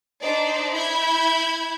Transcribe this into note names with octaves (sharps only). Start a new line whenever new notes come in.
D4 D#4 C5 D5
E4 B5 G6 G#6